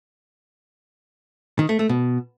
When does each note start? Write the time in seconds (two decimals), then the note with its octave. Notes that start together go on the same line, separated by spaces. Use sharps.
1.59 D#3
1.69 A3
1.79 A3
1.89 B2